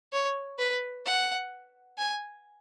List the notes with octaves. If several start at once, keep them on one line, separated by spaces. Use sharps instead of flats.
C#5
B4
F#5
G#5